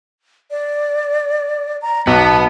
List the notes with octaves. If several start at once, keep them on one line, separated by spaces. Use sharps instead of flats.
D5
A#5
B1 B3 A5